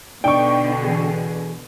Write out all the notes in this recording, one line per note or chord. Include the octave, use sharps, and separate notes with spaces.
B2 D3 D4 D#4 D5 G5 C#6
E3 G#4